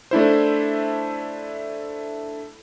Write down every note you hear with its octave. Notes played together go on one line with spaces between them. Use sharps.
A3 D4 E4 C5